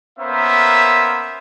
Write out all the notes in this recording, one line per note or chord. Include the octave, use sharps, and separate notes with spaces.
A#3 B3 C#4 A#4 C5 E5